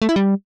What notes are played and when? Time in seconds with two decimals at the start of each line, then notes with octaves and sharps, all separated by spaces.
0.02 A3
0.09 E4
0.16 G3